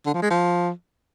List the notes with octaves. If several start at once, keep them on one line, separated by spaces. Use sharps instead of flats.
D3
F3
G#3
F3